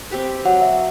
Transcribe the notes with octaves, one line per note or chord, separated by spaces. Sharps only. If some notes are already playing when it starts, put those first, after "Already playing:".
C4 G4 B4
F#3 F#5
E5